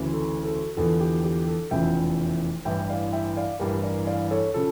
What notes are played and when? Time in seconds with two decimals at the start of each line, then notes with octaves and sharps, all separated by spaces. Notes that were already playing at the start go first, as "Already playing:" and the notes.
Already playing: D2 C#3 E3
0.13 A4
0.45 A4
0.76 E2 D3 F3 A4
1.00 G4
1.24 G4
1.47 A4
1.71 F1 E2 C#3 F3 E5 G5
2.65 A1 G2 E3 E5 G5
2.89 D5 F5
3.12 E5 G5
3.36 D5 F5
3.60 A1 G2 E3 G4 A#4
3.84 A#4 D5
4.07 D5 F5
4.31 A4 C#5
4.54 C#3 F3 A4